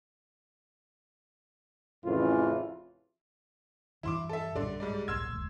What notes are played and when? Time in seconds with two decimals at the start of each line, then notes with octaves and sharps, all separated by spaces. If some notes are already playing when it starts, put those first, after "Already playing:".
2.05 A1 F2 A2 C#3 E3 F4
4.03 G2 E3 F3 E4 C6 D6
4.29 A4 E5
4.55 B1 G2 A#2 D3 D5 C6
4.80 G#2 G3 D5
5.08 D1 A#1 A#2 C6 E6 G#6
5.33 F1 D2 G#3